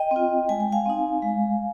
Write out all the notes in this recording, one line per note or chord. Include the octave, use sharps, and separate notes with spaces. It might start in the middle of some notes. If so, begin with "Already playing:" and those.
Already playing: D#5 G5
C4 F4
G#3 G#5
G5
F5 G#5
C4 D#4
G#3